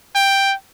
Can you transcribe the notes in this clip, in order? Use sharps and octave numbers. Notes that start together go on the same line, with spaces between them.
G5